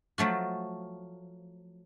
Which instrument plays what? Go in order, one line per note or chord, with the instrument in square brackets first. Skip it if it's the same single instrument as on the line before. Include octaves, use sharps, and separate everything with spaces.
[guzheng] F3 F#3 A3 F#4